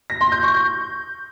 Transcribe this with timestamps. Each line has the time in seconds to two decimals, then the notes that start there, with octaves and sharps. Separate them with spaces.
0.10 A#6
0.21 C6
0.32 G6
0.43 C#6
0.54 G6